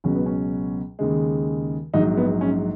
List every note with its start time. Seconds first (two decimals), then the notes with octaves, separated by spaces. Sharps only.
0.04 C#2 B2 F#3 C#4
0.15 B3
0.26 C#4
0.99 D#2 C#3 G#3
1.94 A#1 G#2 F#3 D#4
2.17 B3
2.41 C#4